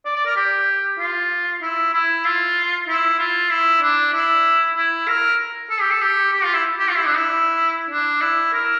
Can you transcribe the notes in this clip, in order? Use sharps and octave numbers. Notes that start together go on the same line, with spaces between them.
D5
D5
A#4
G4
F4
E4
E4
F4
E4
F4
E4
D4
E4
E4
A#4
A4
G4
A4
G4
G4
F4
E4
G4
F4
E4
D4
E4
D4
E4
A#4